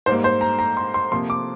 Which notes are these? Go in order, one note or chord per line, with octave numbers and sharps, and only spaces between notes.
G#2 G3 A#3 C5
C5
A#5
A#5
C6
C6
C3 F3 A#3 C6
D6